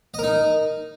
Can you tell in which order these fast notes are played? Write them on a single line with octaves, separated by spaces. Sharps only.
D#5 A#4 D#4